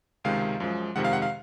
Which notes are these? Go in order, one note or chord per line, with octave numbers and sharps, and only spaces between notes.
C#2 C3 D#3 G#3 F5
F#2 F3 G#3
F2 C3 D#3 G#3 F#5
F5
F#5
F5